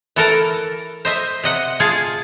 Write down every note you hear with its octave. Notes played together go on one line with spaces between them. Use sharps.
E3 A4 A#4
C5 D#5 E5
C3 D#5 F#5
F4 G#4 G#5 A5